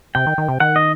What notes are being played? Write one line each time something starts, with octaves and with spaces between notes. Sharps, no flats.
C3 G5
D#3
D#3
C3
D#3 F#5
D#5